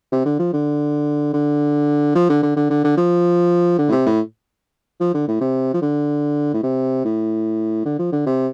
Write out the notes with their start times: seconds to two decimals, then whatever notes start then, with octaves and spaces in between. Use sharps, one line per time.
0.12 C3
0.25 D3
0.39 F3
0.53 D3
1.34 D3
2.15 F3
2.30 D3
2.43 D3
2.57 D3
2.70 D3
2.84 D3
2.98 F3
3.79 D3
3.89 A2
3.92 C3
4.06 A2
5.00 F3
5.14 D3
5.28 A2
5.41 C3
5.74 F3
5.82 D3
6.54 A2
6.63 C3
7.05 A2
7.86 D3
7.99 F3
8.12 D3
8.26 C3